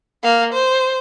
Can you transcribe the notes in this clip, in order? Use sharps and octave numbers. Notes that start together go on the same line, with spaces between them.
A#3 F5
C5